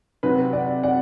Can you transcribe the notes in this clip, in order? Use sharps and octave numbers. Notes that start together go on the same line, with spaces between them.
C3 F#3 C4 B4
D5 F#5
D5 F#5